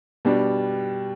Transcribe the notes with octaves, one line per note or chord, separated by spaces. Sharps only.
B2 G3 D4